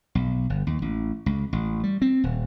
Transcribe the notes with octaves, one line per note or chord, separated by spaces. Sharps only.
B1
G1
D#2
A1
C#2
A1
G3
C4
D#1